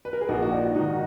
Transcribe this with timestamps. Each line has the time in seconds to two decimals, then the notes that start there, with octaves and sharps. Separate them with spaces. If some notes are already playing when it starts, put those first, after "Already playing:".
0.05 B4
0.13 A#4
0.21 G#4
0.29 A#1 D#4 F#4
0.43 F#4
0.52 D4 F4
0.74 G#2 D#3 D#4 F#4